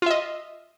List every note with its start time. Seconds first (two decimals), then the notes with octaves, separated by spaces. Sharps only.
0.02 F4
0.06 E5
0.11 D#5